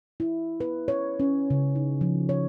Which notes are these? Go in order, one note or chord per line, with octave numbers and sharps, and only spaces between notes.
E4
B4
C#5
C#4
C#3
D#4
F3
C#5